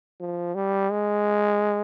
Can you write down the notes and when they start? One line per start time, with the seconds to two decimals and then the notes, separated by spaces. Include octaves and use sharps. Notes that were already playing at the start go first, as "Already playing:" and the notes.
0.20 F3
0.55 G3
0.91 G#3